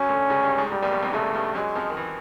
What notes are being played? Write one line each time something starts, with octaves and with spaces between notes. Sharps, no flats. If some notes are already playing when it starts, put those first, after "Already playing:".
Already playing: F#2 F#3 C#4
D2 D3
C#2 C#3
G2
G#2
G#2 G3
A#1 A#2
B1 B2
C2 C3
C#2 C#3 A3
G2 G3
F#2 F#3 G#3
F2 F3
D#3
E3